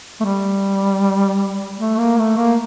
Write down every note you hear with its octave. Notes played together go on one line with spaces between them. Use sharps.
A3
G3
A3
A#3
A3
A#3